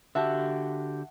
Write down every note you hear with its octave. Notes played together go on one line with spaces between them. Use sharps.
D3 F#4 G4 E5 F#5 A5